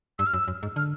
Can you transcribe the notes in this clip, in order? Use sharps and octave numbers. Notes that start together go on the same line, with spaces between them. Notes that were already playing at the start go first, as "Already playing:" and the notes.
G2 E6
F6
F#2 E6
F#2
G#2
D3 F6